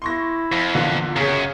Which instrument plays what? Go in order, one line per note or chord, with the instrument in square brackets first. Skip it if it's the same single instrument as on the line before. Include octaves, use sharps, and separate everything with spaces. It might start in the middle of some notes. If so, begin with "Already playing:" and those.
[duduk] E4 [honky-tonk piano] C6 C#6 A#6
[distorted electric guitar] F2
[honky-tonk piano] E2 A#2 D3
[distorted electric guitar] F#2 [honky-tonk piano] C#3 G#4 [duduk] C#5